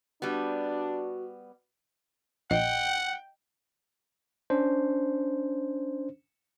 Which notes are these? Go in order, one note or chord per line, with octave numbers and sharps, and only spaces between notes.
G3 B3 D4 F#4
A#1 D#5 F#5 G5
C#4 D4 C5